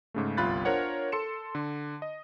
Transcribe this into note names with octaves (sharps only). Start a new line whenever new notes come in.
G#2 C#3 A3
G1 C2 F4 B5 F#6 A6
D4 F4 A#4 C5 C#5 F#5
A4 C6 C#7 E7
D3
D#5